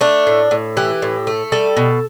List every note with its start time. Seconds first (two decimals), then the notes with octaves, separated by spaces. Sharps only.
0.01 A3 D4
0.27 A2
0.51 A2
0.77 E3 G4
1.02 A2
1.27 A3
1.52 G3 A4
1.77 B2